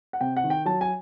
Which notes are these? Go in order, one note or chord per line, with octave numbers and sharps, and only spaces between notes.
F#5
C3 G5
F#5
D#3
G5
F#3 A5
G#5